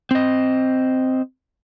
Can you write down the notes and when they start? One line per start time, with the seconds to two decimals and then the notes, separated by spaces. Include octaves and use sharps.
0.11 C4 D#5